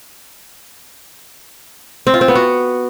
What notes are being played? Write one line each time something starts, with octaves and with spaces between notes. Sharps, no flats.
C4
F4
C4
B3
F#4